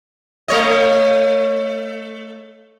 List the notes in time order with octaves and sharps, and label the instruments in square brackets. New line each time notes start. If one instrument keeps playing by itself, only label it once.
[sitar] A3 C#5 D#5